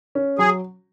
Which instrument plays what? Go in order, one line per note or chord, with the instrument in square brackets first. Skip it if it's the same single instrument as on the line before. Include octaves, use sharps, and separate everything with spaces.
[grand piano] C#4
[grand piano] F#3 [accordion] G#4